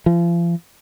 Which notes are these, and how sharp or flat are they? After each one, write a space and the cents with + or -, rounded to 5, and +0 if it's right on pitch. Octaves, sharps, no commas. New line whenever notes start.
F3 -40